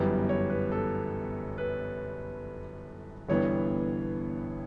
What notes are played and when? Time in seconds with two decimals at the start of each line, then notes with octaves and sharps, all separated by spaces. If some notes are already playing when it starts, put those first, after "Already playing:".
Already playing: G1 F#2 E3 G3 B3 G4
0.29 C#5
0.50 B4
0.72 A4
1.58 B4
3.29 G1 G2 E3 B3 C#5